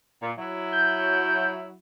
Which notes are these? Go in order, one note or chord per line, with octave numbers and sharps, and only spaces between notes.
A#2
F#3 E4
G6